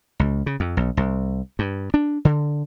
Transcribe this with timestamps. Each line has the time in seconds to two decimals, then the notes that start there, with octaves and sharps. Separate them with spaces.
0.20 C#2
0.46 C#3
0.60 F2
0.77 B1
0.97 C2
1.59 G2
1.94 D4
2.25 D3